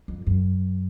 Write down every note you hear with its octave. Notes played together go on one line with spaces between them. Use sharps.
F2
F#2